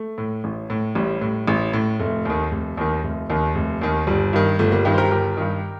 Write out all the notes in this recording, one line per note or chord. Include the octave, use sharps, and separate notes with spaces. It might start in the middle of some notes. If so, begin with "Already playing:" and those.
Already playing: A3
A2
A1
A2
A1 G3
A2
A1
A2
F1 A3
D#2 D#3
F1
D#2 D#3
F1
D#2 D#3
F1
D#2 D#3
G1 G3
G2 D#3
G1 A3
G3 A#3
G2 D#3 D#4 G4
C5
G4 A#4
G1 G4 A#4
G2 D#3